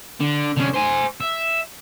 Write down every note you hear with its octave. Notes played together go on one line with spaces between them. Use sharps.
D3
D3 C#4
C5 G#5
E5